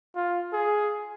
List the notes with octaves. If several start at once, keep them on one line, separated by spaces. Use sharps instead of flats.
F4
G#4